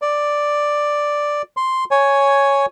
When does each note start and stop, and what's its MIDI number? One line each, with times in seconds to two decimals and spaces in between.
0.02 1.42 74
1.57 1.84 84
1.91 2.66 73
1.91 2.66 80